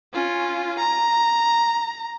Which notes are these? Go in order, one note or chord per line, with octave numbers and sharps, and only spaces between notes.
C#4 F4
A#5